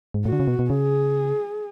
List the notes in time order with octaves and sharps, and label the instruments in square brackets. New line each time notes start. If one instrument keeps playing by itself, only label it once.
[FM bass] G#2
[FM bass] A2 [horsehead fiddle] F#4
[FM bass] D3
C#3
B2
B2
[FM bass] C#3 [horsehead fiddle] G#4